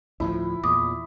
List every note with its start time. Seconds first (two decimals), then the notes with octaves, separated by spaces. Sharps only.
0.20 D2 A2 F3 E4
0.64 E2 A#2 D6 D#6